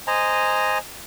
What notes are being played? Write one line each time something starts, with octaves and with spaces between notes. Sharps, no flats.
C5 D#5 G#5 A#5